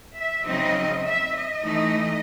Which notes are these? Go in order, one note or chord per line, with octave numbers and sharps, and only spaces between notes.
E5
C#3 F#3 C4 D#4 D#5
E5
D#5
E3 A3 D#4